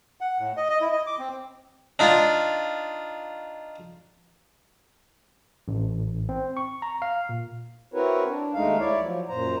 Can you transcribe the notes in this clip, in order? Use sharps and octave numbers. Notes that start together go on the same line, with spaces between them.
F#5
A2
D#5
D#5
E4
D#5
D6
C4
D4 D#4 F4
A1
C4
C#6
A#5
F5
A#2
C4 E4 F#4 A#4 B4 C#5
D4
D#2 G#3 A3 D#4 F5
E4 C#5 D5
F3 F#3
F#2 A#2 C5 A#5